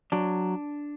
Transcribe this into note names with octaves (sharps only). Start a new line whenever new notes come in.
F#3 D4